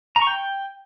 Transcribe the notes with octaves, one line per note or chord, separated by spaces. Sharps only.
A#5
C#6
G5